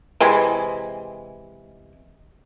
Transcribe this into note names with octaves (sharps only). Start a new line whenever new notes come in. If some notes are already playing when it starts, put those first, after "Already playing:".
C3 E3 G#3